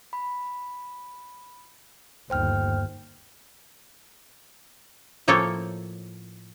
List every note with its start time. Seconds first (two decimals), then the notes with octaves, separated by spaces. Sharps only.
0.13 B5
2.30 G1 D#2 C5 G5 F6
5.28 A2 F3 A#3 A4 C#5 G5